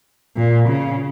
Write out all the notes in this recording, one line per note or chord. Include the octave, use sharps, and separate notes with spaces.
A#2
C#3